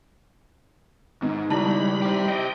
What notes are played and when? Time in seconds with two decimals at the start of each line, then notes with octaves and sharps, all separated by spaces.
1.22 G#2 D#3 B3
1.50 C#2 G3 E4 A5 B5
2.02 G4 C5
2.28 D#5 G5